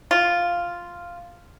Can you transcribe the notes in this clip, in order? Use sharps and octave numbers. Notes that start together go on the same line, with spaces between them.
F4